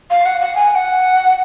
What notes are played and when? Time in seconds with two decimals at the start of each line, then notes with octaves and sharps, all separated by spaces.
0.11 F5
0.26 F#5
0.41 F#5
0.56 G#5
0.71 G#5
0.75 F#5